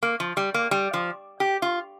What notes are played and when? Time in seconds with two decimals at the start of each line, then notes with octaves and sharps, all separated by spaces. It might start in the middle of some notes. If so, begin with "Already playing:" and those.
0.03 A#3
0.20 F3
0.37 G3
0.54 A#3
0.71 G3
0.94 F3
1.40 G4
1.62 F4